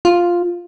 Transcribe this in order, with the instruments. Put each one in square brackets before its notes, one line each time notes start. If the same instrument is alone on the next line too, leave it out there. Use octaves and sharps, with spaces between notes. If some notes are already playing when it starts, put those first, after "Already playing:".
[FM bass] F4